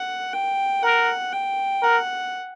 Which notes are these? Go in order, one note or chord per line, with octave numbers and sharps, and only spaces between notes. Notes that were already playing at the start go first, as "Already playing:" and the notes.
Already playing: F#5
G5
A#4 F#5
G5
A#4 F#5